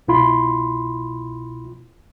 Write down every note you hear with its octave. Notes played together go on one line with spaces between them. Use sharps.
C2 B2 E4 F4 B5 C6